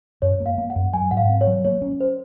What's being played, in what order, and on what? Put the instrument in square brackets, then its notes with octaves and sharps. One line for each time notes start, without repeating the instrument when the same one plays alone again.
[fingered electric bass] F#2 [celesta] C#5
[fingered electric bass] A#3
[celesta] F5
[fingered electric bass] A#3
[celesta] F#5
[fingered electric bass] F#2
[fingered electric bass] F#3 [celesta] G#5
[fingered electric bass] G#2 [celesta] F#5
[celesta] F5
[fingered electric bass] C4
[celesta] C#5
[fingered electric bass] F#3
[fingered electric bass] A#3 [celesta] C#5
[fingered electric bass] C#4
[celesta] C5